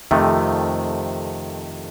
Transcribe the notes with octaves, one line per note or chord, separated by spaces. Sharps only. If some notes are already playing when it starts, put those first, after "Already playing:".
F2 C3 D#3 A3